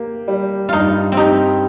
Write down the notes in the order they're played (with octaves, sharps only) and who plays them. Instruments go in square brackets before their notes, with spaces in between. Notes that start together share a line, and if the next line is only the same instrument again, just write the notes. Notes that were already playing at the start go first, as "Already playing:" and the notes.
Already playing: [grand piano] A#3 G4
G3
[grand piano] G2 [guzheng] D#4 F4
[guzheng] C4
[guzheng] D#4 [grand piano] G4